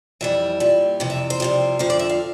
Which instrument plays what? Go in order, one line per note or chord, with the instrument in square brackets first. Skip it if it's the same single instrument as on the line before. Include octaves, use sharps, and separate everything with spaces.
[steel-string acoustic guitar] F2 E3 G3 E5
A#2 G3
F2 C3 E3
E5
C5
F2 C3 G3
F2 D3 F3 C5
D5
E5
F5